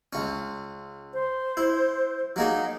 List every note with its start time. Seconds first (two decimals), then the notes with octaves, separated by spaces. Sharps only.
0.13 C#2 C#4
1.13 C5
1.57 E4
2.36 F#3 A#3 D#4 G#4